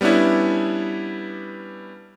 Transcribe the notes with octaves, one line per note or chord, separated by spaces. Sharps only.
G3 B3 C#4 D4 E4